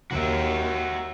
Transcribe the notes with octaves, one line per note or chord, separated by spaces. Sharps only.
D#2 F#4 A#4 E5